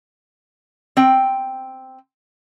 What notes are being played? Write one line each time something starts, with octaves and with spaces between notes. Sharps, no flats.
C4 G5